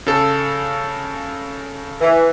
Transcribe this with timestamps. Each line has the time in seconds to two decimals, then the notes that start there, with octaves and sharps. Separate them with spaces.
0.06 C#3 A4
2.01 E3